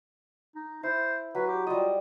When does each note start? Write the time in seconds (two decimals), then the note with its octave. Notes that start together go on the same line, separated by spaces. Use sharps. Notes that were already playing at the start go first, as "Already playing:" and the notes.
0.55 D#4
0.83 E4 C5
1.35 F#3 B4
1.48 G4
1.67 G3 F4 D#5